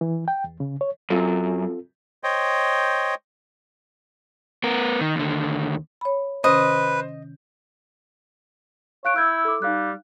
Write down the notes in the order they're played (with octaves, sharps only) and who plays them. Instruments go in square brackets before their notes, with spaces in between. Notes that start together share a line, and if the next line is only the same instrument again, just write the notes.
[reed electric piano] E3
G5
E2
C#3
C#5
[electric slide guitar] F#2 [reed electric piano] C4 F4 A4
[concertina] C5 C#5 D#5 G5
[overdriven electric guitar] B3 A#4
D#3
D#2 D3
[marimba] C#5 B5
[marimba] C3 D#3 C#4 [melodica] B4 [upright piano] C5 [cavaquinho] D#5
[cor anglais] C#5 [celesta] F5 F#6 D7
[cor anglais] E4 [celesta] E6 G6 G#6
[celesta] A4 D6
[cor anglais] G3 [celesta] D#4 F5 F#6